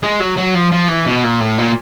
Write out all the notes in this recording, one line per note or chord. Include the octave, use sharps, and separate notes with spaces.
G#3
F#3
F#3
F3
F3
E3
B2
A#2
A2
A#2